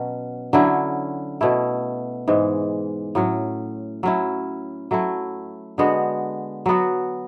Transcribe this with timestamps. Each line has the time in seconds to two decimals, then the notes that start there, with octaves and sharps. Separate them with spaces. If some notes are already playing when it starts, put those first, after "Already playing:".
Already playing: B2 F#3 C#4
0.53 D3 F#3 C#4 E4
1.41 B2 A3 E4
2.28 G#2 E3 G#3
3.15 A2 F#3 C#4
4.03 F#3 C#4 E4
4.91 F#3 A3 E4
5.78 D3 G#3 B3 F#4
6.66 F#3 B3 F#4